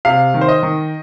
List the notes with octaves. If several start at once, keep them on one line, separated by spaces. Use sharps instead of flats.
C3 F5
D#3
C5
D#5
D#3